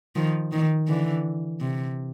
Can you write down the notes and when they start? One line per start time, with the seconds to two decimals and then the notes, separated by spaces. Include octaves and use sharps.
0.16 D#3 F3
0.52 D#3
0.88 D3 E3
1.61 C3